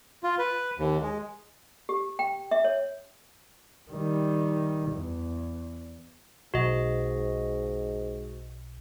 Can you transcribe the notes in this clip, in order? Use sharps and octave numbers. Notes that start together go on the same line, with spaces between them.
F4
B4
D#2
G#3
G4
G5
E5
C#5
D#3 G3
E2
B1 G#2 F#4 D#5